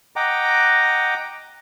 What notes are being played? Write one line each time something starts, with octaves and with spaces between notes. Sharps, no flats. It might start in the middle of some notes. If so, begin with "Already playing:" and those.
D#5 F#5 G5 A#5 D6